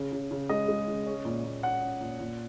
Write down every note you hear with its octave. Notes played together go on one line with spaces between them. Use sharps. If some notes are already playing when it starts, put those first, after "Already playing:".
Already playing: C#3
C#3
C#3
G#3 D#5
G#3
C#3
C#4
A#2
A#2
C#4 F#5
C#4
A#2
A#2